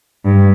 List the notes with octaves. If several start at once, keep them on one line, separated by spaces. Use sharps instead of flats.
G2